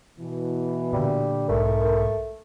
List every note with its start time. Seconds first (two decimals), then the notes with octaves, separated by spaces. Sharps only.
0.19 B2 E3
0.93 A#2 D3 G3
1.49 B1 G#2 A3 A#4